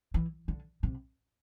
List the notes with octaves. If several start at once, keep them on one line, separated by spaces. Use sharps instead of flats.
E3
D3
C3